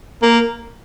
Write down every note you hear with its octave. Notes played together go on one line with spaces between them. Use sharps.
A#3